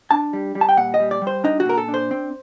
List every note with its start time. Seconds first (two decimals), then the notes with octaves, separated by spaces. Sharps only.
0.11 D4 A5
0.33 G3
0.55 G3
0.61 A5
0.69 G5
0.77 A#2 F#5
0.94 D#5
1.00 G3
1.11 D5
1.22 G3
1.27 C5
1.44 D4 D#4
1.60 F#4
1.66 A#2 A#4
1.78 A4
1.88 D4
1.94 C5
2.11 C4